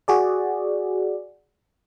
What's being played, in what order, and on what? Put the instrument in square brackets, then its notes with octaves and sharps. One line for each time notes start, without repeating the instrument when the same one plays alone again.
[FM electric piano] F#4 G#4 D5